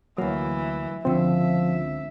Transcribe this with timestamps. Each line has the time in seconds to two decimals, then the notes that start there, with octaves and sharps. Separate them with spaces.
0.18 D2 E3 F#3 A#3
1.05 C#2 D3 F3 C4 E5